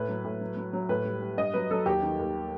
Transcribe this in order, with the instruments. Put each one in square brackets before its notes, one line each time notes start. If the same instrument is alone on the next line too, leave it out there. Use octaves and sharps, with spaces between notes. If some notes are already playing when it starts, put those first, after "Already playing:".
Already playing: [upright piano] A2 B4
F#3
A2
F#3
F#3
F#3
A2 B4
G3
G3
G2 D#5
F#3 B4
F#3 A4
D#2 G4
D#3
D#2